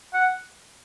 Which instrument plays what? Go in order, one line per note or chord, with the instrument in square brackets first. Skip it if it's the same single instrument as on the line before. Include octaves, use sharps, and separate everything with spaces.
[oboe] F#5